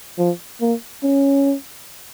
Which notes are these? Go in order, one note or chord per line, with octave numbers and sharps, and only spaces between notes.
F3
A#3
C#4